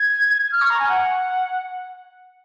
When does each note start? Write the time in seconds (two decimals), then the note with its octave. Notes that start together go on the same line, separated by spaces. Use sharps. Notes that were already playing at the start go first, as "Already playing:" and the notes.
Already playing: G#6
0.52 F6
0.61 C#6
0.70 A#5
0.79 G#5
0.89 F#5